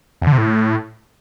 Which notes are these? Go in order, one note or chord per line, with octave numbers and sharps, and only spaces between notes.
E2
D3
C3
A2